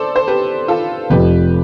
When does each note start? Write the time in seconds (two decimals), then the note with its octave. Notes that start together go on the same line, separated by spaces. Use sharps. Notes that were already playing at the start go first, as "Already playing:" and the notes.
Already playing: A4 C5 D5
0.16 C5
0.28 G4 B4
0.68 F4 A4
1.10 F1 F2 C3 G4 B4